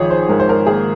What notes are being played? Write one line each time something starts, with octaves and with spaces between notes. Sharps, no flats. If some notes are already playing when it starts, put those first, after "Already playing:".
Already playing: G#1 F3 G#4 C#5
C5
G#2 A#4
C5
A#4
A#3 G#4